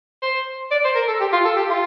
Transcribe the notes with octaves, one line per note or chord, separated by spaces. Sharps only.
C5
D5
C5
A#4
A4
G4
F4
A4
G4
F4